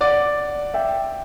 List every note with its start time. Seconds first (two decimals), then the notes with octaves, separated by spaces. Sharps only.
0.01 D5 F#5
0.74 E5 G5